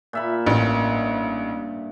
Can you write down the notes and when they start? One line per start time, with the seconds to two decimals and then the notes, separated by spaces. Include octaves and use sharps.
0.13 A#2 E5 B5
0.46 A1 G2